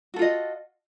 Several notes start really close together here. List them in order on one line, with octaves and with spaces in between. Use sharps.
F#4 A4 F4 D#5